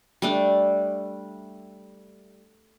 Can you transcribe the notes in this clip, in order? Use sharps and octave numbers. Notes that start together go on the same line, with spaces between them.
G3 A3 D4